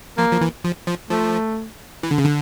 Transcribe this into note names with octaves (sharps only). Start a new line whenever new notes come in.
F3 A#3
F3
E3
F3
F3
F3 A3
E3
D3
C#3
D3